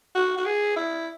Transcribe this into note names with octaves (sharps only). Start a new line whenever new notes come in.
F#4
F#4
G#4
E4